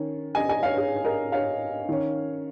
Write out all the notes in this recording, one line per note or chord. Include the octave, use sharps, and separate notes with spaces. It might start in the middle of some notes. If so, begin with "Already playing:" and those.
Already playing: D#3 C#4
D#5 G#5
D#5 G#5
C#5 F5
G#4 C#5
A#4 D#5
C#5 F5
D#3 C#4